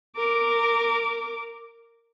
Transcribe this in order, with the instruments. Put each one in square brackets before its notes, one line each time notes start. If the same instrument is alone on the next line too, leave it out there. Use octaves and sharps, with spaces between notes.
[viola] A#4 D6